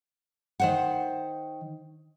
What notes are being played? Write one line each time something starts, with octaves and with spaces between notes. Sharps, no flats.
D#3 C5 F#5